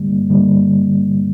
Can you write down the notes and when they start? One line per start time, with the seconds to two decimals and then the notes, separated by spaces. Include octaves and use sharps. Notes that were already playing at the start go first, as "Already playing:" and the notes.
Already playing: G2 D3 G3 A#3
0.29 G2 D3 G3 A#3